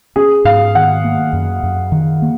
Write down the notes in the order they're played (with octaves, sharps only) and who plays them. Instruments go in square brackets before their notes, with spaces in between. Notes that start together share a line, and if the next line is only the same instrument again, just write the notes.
[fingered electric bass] C#4 [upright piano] G#4
[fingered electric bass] G#2 [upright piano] F5
[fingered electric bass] D#3 [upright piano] F#5
[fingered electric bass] A#3
F#2
F#2
D#3
A#3